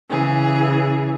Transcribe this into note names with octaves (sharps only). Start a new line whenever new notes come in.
C#3 E3 G#4